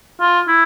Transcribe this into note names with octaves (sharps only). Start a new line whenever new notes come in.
F4
E4